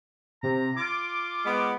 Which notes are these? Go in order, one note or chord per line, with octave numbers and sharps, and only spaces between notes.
C3 A#5
F4 D6
G#3 B3